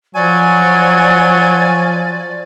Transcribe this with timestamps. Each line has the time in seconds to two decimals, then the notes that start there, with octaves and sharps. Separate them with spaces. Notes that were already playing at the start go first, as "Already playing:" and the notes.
0.15 F3 F#3 D5 G#5